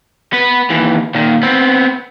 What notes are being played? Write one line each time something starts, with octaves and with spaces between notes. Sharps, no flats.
B3 B4
D#2 E3
A#2 D#3
B3 C4